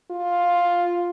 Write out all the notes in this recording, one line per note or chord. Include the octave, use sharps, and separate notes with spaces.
F4